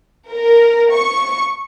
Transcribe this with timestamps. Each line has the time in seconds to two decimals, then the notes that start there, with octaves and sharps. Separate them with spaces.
0.31 A#4
0.92 C#6